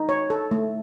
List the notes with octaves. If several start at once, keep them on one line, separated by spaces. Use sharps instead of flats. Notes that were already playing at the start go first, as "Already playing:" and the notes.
Already playing: D#4
C#5
A4
A3